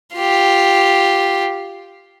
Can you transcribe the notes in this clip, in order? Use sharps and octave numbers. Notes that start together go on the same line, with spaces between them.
F4 G4